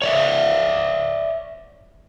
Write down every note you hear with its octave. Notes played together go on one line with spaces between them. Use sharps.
C#5 D5 E5